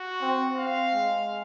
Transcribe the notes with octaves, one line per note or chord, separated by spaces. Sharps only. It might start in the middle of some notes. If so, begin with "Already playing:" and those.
Already playing: F#4
C4
C4 F5
G#3